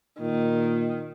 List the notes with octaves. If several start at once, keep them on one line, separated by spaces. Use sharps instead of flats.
A#2 D#3